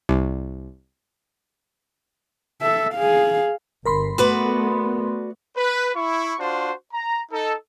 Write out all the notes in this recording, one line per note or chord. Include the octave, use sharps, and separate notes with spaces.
C2
A4 E5
G#4 F5
G1 A#4 B5 C6
A3 B3 F#4 B4 D5
B4
E4 C#6
D4 F4 F#4 C5
A#5
D#4 A4